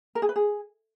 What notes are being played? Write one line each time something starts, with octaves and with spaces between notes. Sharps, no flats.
A#4
G#4
B4
G#4